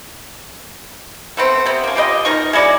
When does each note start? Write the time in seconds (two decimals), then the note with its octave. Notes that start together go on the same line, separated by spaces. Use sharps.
1.37 A3 B3 C4
1.66 C3 B3
1.84 A#3 C#4
1.96 F4 G4 B4 D#5
2.25 B2 D#4 A#4 C#6
2.53 G#3 E4 F#4 D5